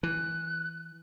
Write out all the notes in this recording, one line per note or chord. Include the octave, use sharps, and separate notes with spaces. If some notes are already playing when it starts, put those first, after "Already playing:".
E3 F#6